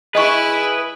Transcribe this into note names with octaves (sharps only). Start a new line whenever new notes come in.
E4 G#4 B4 D#5 C#6